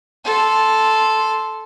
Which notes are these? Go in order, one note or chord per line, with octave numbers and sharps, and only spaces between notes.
A4 C6